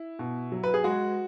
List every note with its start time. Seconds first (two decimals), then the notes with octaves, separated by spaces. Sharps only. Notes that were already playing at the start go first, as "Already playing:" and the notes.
Already playing: E4
0.19 B2
0.52 F#3
0.64 B4
0.74 G#4
0.84 G#3 F#4